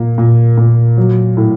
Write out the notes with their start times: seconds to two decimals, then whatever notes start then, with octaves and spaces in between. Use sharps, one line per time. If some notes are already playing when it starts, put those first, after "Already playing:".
Already playing: A#2 A#3
0.18 A#2
0.58 A#2
0.98 F#3
1.37 A2